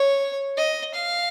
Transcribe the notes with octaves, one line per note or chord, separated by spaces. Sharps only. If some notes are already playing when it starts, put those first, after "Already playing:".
Already playing: C#5
D#5
F5